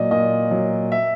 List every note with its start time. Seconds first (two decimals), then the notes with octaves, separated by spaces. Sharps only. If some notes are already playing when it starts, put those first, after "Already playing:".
Already playing: A#2 F#3 D5 D#5
0.11 A#2 D#5
0.51 F#3
0.92 E5